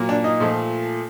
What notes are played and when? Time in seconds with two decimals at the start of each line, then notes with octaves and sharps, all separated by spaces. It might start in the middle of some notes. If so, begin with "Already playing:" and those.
Already playing: A#2 F#3 A#3
0.09 D4
0.24 D#4
0.40 A#2 F3 A3